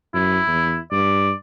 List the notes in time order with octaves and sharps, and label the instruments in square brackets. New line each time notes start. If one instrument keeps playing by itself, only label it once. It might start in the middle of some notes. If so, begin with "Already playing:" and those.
[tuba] F#2 [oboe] E4
[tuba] E2
[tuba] G2 [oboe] D5